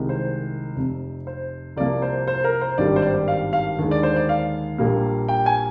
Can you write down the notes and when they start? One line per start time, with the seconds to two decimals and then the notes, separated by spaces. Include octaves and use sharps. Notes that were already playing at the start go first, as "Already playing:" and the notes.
Already playing: C2 C3 D#3 G#3
0.09 C5
0.76 F1 F2 C3
1.27 C5
1.77 C2 C3 F3 A#3 D5
2.02 C5
2.28 C5
2.44 A#4
2.61 C5
2.78 G#1 G2 D#3 G3 D5
2.96 C5
3.02 D5
3.28 F5
3.53 F5
3.79 D#2 D3 G#3
3.91 D5
4.03 C5
4.16 D5
4.29 F5
4.78 A#1 A#2 G3 A#3
5.28 G5
5.46 G#5